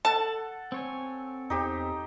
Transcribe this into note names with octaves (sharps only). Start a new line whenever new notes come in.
A4 F#5 A5
C4 C#5 G#5
E2 D#4 G4 C5